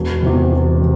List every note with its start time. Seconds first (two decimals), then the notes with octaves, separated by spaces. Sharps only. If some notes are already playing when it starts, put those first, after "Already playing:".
Already playing: E1
0.23 E2 C3
0.51 E1
0.81 C3